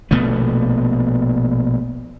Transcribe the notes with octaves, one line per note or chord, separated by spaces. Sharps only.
A#1 B2 A3 B3